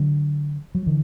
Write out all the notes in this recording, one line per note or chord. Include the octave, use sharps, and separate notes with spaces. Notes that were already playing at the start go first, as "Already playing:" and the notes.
Already playing: D3 F#3
F#3
D3 E3